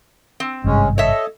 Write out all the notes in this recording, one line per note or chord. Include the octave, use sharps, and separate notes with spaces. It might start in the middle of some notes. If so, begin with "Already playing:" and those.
C4
G#1 G2 C3 G#3 C#4
A4 C#5 D#5 E5